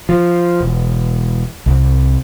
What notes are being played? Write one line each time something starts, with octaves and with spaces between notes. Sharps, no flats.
F3
E1
C2